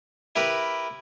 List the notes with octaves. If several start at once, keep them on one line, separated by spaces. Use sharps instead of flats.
E4 G4 A#4 B4 B5